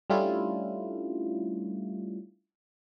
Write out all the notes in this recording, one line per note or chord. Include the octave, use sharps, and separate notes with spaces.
G3 A3 C#4 D4 E4 F4